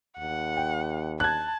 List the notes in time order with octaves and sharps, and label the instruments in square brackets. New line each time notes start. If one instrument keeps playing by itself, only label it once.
[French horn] D#2 [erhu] F#5
[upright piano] G5
[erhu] A5 [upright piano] F#6 G#6